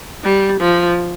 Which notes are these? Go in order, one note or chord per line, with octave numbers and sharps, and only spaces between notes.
G3
F3